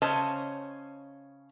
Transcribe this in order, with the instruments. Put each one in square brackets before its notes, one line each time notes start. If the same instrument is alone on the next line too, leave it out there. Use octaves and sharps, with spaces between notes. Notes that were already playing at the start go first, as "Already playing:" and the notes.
[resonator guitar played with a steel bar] C#3 C#4 C5 D#5 A5